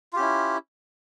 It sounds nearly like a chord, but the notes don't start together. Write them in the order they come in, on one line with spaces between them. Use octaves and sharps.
F4 G4 C#4 E4